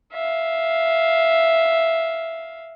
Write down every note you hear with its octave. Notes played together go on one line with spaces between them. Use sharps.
E5 F5